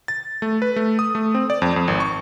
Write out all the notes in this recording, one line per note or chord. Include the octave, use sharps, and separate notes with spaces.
A6
A3
B4
A3
D#6
A3
C4
D5
F2
F2
G#1
C#6